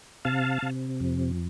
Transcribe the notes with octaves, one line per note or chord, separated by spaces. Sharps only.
C3 F5 A5
C3
F2